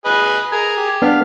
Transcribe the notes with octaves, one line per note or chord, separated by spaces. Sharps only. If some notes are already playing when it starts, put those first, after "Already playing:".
G#4 B4 D#5
G#4 A#4
G4
B3 D4 F5